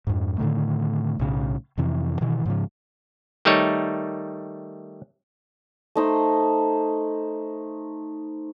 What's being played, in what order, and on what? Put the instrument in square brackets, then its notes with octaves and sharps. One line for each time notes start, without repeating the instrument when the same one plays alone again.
[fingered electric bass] F2 G#2
A2 D3 D#3 A3
B1 A2 C#3
F2 C3 E3
B2 D#3 E3
G#2 C#3 F3
[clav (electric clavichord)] D#3 G3 A3 D#4 C#5
[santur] A3 D#4 C5